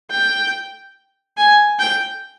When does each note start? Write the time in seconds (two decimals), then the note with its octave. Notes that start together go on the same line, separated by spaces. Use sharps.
0.11 G5
1.37 G#5
1.79 G5